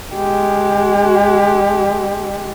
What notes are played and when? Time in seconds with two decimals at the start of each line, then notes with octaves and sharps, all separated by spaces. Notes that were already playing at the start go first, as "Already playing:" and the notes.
0.14 G#3 G4